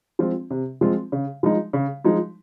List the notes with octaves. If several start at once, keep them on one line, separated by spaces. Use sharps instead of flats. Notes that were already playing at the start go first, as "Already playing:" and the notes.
F3 G#3 C4 F4
C3
F3 G#3 C4 F4
C#3
F3 G#3 D#4
C#3
F3 G#3 D#4